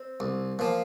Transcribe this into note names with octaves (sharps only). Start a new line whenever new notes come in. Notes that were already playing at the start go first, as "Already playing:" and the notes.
Already playing: C4
C2
A#2 F3